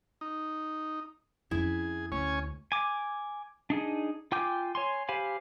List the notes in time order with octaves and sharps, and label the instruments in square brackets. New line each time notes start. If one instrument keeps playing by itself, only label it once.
[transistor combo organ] D#4
[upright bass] F2 C#4 [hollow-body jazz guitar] E4 [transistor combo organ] G#4
[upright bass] D2 [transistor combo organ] C#4 C#5 G#5
[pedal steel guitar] G#5 D6
D4 D#4 G#4
F4 G5 G#5 D6 G6
C#5 G#5 C6
G4 C5 F5 G#5 B5